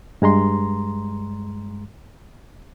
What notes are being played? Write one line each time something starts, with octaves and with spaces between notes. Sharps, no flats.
G2 G#3 A#5 C6